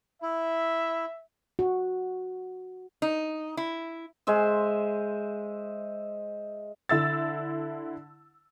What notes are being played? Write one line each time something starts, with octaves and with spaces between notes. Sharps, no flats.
E4 E5
F#4
D#4
E4
G#3 C5 E5
D3 E4 E6 A6